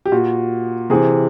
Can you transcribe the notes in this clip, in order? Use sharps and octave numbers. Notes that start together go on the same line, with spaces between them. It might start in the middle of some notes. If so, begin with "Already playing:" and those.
G4
A#2 F#4
C3 E3 G#4